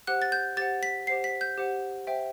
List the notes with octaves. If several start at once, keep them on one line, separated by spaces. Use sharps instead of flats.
G4 C5 F#5 F#6
A6
G6
G4 C5 F#5 A6
B6
G4 C5 F#5 C7
B6
G6
G4 C5 F#5
C5 E5 G5